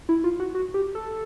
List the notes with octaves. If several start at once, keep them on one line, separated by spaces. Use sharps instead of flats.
E4
F4
F#4
F#4
G4
A4